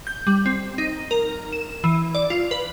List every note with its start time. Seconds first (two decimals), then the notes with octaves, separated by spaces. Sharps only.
0.07 G6
0.27 G3
0.46 C4
0.78 D#4
1.11 A#4
1.53 E7
1.84 E3
2.15 D5
2.30 F4
2.51 B4